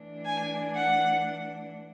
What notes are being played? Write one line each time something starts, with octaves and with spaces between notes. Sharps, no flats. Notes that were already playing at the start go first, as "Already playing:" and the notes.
Already playing: E3 A3 D4
G#5
F#5